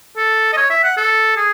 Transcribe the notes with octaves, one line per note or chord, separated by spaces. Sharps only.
A4
D#5
C#5
E5
F#5
A4
G#4